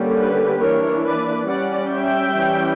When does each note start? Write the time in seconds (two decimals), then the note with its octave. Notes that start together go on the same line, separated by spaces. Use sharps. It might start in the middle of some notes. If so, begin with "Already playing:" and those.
Already playing: D3 G3 A#3 C#4
0.19 G4 B4
0.62 E3 A#3 D4 A#4 C#5
1.04 B4 D5
1.48 G3 C#4 D5 F#5
1.91 E5 G5
2.34 E3 G3 C#4